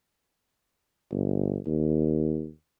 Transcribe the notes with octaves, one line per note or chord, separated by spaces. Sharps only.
G1
D#2